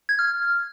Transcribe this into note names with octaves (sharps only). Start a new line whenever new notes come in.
G#6
F6